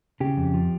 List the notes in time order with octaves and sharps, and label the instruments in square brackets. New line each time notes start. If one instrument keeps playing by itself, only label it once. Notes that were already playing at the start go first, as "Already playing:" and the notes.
[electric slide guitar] C#3 G4
F2
F3